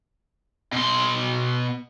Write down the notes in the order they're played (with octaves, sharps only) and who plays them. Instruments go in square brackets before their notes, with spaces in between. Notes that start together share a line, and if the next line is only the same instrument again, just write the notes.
[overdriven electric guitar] B2 C6